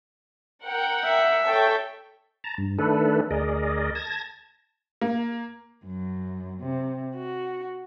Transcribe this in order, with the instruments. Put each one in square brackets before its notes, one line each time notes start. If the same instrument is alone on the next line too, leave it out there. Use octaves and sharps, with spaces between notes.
[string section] A#4 F#5 G5
[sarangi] E5
[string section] A4 C#5 G5
[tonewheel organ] A5 A#5
G2
D#3 A3 D4 A4 B4
D2 G#4 A#4 D5 D#5
A5 G#6 A#6
[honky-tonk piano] A#3
[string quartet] F#2
C3
F#4